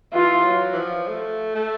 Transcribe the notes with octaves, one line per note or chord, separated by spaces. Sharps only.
E3 F4
F#3
E3
F3
A3
A3